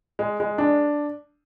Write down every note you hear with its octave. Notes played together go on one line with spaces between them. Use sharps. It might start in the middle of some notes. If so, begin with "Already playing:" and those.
G#3
G#3
D4